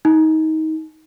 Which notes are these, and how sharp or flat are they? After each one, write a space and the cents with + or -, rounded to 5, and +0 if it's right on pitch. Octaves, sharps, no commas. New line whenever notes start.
D#4 +25